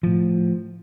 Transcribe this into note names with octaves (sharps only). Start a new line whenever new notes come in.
A2 F3